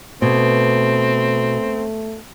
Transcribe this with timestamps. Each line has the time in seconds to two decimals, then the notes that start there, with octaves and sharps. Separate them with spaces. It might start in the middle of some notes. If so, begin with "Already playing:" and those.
0.22 B2 A3 C4